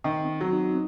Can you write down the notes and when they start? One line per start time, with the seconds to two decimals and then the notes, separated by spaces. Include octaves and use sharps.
0.04 D#3 C4
0.29 C4
0.41 F#3
0.53 D#4